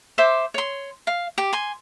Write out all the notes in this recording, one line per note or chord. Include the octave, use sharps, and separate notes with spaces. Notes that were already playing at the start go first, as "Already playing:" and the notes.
C5 E5 C6 D6
C#5 C6
F5
G4
G#5 C6